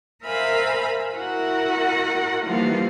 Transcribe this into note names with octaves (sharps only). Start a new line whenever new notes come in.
A#4 C5 E5 F5 G#5 B5
E4 F#4 A#4 F#5
E3 F3 G3 A#3 D#4 F4